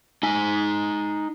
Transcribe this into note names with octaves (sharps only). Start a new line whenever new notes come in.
D#4 G#5